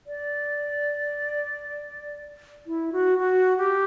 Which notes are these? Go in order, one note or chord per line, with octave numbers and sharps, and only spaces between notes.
D5
E4
F#4
F#4
G4